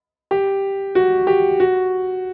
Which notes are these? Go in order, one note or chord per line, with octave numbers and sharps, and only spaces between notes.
G4
F#4
G4
F#4